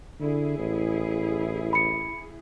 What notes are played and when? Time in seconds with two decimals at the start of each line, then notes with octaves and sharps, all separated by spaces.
0.21 D3 E4 G#4
0.58 A1
1.73 B5 C#7